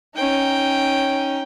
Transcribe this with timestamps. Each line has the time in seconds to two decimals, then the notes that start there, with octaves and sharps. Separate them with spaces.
0.15 C#4 D#4 G5